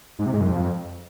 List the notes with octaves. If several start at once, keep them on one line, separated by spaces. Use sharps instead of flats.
G#2
C3
G#2
F#2
F2